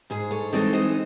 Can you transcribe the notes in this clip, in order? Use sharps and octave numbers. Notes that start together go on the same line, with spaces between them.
G#2 G#4 C5
A4 C#5
E3 G#3 C4 D#4 A4 C#5
C5 D#5